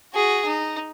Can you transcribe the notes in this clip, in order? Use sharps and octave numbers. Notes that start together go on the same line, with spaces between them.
F#4 G#4
D#4